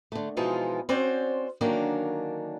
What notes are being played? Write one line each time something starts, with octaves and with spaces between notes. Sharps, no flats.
D3 A3
B2 E3 F3 G#3 D#4 F4
C4 C#4 F#4 C5 D5
D3 D#3 F#3 A#3 C#4 D4